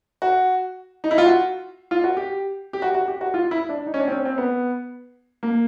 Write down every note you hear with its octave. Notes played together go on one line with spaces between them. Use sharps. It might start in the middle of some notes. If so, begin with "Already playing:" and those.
F#4
D#4
E4
F4
F#4
F4
F#4
G4
G4
F#4
F#4
G4
F#4
F4
E4
D4
D#4
C#4
D4
C4
C#4
C4
B3
A#3